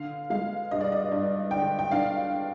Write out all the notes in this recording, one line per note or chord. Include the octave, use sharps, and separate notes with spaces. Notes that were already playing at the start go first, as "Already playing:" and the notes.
Already playing: D3 F5
G#3 F5
G2 D#5
D5
D#5
G2
D3 G5
G5
D4 F5